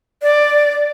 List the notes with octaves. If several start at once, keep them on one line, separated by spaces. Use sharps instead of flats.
D5